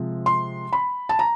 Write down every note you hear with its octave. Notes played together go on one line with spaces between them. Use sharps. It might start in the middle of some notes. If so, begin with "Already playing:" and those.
Already playing: C3 F3 G#3
C6
B5
A5
A#5